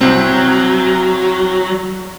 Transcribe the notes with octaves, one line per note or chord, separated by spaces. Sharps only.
C2 F#3 C4